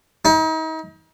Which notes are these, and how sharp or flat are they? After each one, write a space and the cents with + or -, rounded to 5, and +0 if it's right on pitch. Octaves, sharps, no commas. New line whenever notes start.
D#4 +40